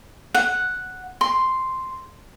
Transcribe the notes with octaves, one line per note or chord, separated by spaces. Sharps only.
F#5
C6